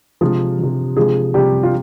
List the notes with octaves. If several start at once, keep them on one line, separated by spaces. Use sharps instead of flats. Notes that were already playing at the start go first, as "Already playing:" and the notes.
C3 F3 G#3 G#4
C3 F3
C3 F3 G#3 G#4
C3 F3 G3 G4
F4